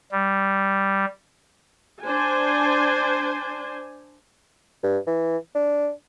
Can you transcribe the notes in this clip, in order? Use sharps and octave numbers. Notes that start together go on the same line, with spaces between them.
G3
D4 C5 G#5
G2
E3
D4